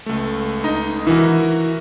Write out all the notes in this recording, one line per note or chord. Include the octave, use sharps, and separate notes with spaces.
C#2 A3
D#4
E3 F#4 A#4 E5